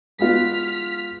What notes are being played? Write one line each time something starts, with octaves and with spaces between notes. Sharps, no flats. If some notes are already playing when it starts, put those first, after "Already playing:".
G#3 B3 F4 F6 B6